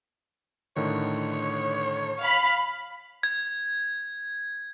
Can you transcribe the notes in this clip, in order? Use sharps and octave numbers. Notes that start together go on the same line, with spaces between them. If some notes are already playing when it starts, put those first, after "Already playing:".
A2 D3 D#3 C#5
F5 B5
G#6